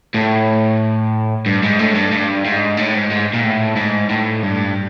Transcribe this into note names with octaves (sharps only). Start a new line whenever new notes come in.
A2
G2
G#2
A2
G2
G2
G#2
A2
G#2
G#2
A#2
A2
G#2
A2
G2